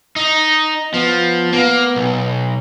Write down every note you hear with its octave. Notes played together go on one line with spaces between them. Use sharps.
D#4
F3 B3
A#3 B3
B1